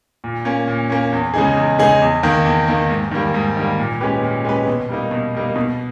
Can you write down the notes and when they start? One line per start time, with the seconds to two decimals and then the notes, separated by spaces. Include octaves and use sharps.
0.24 A#2
0.45 A#3 C#4
0.68 A#2
0.89 A#3 C#4
1.12 E2
1.34 C#3 G#3 D#4 G#4
1.57 E2
1.79 C#3 G#3 D#4 G#4
2.01 E2
2.23 D#3 A#3
2.45 E2
2.68 D#3 A#3
2.90 G#2
3.11 D#3 G3 A#3
3.34 G#2
3.57 D#3 G3 A#3
3.79 A#2
4.01 G#3 C#4 G4 B4
4.23 A#2
4.45 G#3 C#4 G4 B4
4.67 B2
4.89 G3 A#3 D#4
5.11 B2
5.35 G3 A#3 D#4
5.56 B2